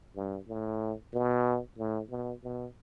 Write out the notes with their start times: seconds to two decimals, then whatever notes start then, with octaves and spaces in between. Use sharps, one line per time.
0.16 G2
0.48 A2
1.13 B2
1.78 A2
2.10 B2
2.43 B2